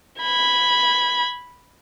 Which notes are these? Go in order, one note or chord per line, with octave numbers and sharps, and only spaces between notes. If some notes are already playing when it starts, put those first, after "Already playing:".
B5 G#6